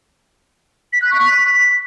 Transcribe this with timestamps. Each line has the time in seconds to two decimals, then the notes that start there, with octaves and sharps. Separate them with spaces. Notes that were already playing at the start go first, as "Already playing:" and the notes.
0.93 B6
1.02 F#6
1.11 C#6
1.20 B6